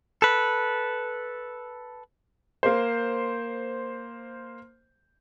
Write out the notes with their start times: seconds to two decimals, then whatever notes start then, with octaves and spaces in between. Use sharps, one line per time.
0.22 A4 B4
2.63 A#3 C5